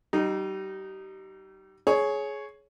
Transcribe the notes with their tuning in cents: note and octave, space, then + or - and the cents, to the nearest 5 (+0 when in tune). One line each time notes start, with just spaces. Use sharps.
G3 -30 D#4 -10
G#4 +20 C#5 +0